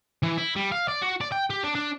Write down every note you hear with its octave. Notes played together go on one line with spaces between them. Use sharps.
E3
E4
G3
F5
D5
F#4
D5
G5
G4
D4
D4